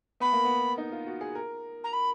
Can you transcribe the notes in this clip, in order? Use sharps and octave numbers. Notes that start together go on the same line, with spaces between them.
B3 B5
A#3
B3
D#4
F4
F#4
G#4
A#4
A#5
B5